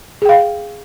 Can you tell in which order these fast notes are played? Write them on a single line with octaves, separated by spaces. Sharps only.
G#4 G5 F5